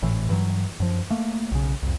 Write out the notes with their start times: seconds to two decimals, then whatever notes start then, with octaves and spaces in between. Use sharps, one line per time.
0.02 G#1 A2 E3
0.29 G2 E3 F#3
0.80 F#2 F3
1.10 A3 A#3
1.52 B1 C#3
1.82 C2 F2